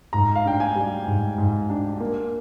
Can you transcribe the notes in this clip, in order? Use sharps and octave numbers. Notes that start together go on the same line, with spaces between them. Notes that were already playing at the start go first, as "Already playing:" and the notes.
G#2 A#5
F5
D4 G5
G#5
G3
G#2
G#2
D4
A#3